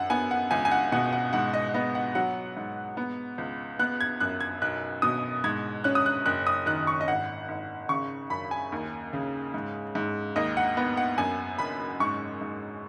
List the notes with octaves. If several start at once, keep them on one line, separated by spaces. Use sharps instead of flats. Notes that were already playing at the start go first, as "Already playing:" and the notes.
Already playing: F#2 F#5
B3 G#5
F#5
C#2 G#5
G#5
F#5
B2 F#5
F#5
G#2 F#5
D#5
B3 D#5
F#5
F#3 F#5
G#2
B3
C#2
B3 F#6
G#6
F#2 F#6
G#6
B1 F#6
B2 D#6
G#2 G#6
C#4 F#6
D#6
F#6
F#1 F#6
D#6
D#3 F#6
C#6
D#5
G#1 F#5
G#1
C#3 C#6
F#2 B5
G#5
D#2
C#3
G#2
G#2
D#2 D#5
F#5
B3
F#5
F#2 G#5
F#1 B5
G#2 C#6
G#2